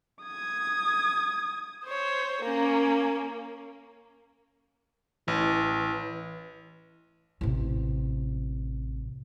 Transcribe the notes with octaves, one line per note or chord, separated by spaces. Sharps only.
D#6 G#6
C5 C#5
A#3 C#4
A1 E3
A1 C3